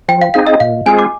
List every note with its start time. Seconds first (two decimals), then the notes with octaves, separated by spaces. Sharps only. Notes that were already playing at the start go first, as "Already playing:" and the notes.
0.09 F3 G5
0.21 F5
0.34 C4 D#4 G#4 F5
0.47 D#5
0.60 A#2 F5
0.86 G#3 C4 F4 G#4 G#5
0.99 D6